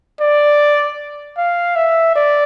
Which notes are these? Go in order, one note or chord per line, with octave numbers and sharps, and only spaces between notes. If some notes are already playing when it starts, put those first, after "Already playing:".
D5
F5
E5
D5